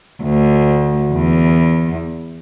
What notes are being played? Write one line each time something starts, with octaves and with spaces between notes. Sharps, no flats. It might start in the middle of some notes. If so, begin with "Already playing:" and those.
D2
E2